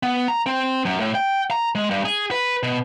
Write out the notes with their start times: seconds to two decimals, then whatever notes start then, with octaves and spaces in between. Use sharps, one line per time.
0.03 B3
0.28 A#5
0.46 C4
0.85 F#2
1.00 A2
1.15 G5
1.51 A#5
1.75 G#3
1.91 G2
2.05 G#4
2.31 B4
2.63 B2